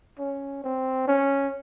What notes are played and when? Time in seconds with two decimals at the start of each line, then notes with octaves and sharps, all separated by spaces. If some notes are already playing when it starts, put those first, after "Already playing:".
0.19 C#4
0.64 C4
1.08 C#4